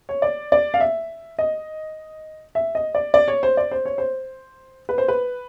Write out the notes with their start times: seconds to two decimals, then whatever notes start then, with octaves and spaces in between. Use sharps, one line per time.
0.09 C#5
0.22 D5
0.52 D5
0.74 F5
0.80 E5
1.39 D#5
2.55 E5
2.75 D#5
2.95 D5
3.14 D5
3.28 C#5
3.43 C5
3.57 D5
3.71 C5
3.85 C#5
3.98 C5
4.89 B4
4.98 C5
5.08 B4